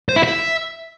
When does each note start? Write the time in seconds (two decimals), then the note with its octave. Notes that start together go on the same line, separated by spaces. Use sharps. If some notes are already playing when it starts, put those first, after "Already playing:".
0.09 C5
0.16 E4
0.24 E5